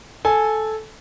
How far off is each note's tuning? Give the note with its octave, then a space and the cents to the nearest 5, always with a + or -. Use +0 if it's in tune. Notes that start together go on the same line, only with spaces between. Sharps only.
A4 -10 G#5 +0